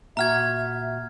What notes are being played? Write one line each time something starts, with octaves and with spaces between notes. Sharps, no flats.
A#2 F#4 E5 A#5 F6 G#6